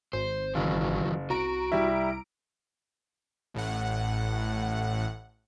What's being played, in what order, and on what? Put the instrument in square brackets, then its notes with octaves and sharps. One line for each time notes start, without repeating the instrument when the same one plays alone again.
[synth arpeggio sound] G#1 [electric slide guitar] C5
[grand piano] F#1 [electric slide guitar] D#3 E3 F#3
[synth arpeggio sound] C2 A#5 D7 [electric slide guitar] F#4
[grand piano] G3 E4
[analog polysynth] A1 A2 F#5